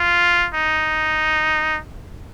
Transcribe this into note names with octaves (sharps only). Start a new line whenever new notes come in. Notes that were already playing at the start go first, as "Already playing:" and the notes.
Already playing: F4
D#4